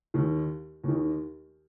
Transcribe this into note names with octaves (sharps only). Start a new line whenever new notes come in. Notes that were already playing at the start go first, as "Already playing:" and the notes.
D#2 D#3
D#2 D#3